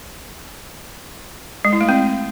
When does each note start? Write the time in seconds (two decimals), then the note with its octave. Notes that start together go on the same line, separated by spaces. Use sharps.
1.65 G#3
1.73 E4
1.81 A3
1.89 C4